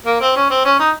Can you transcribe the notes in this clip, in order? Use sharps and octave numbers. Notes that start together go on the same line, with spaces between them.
A#3
C4
C#4
C4
C#4
D#4